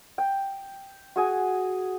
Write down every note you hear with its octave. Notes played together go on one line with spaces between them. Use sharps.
G5
F#4 G#4 G#5